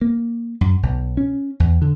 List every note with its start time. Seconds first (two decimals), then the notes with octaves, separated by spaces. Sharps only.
0.02 A#3
0.61 F#2
0.83 B1
1.17 C#4
1.60 E2
1.82 D3